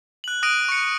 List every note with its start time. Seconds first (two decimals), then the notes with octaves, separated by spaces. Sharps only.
0.24 F#6 F#7
0.43 D#6 F#6 A#6 D7 D#7 F#7
0.68 C#6 C#7